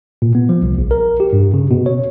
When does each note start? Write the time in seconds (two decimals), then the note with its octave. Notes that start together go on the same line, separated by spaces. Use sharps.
0.22 A#2
0.35 B3
0.49 F3
0.62 C2
0.78 A#1
0.91 A#4
1.20 G4
1.33 G2
1.54 C#3
1.71 B2
1.86 C#5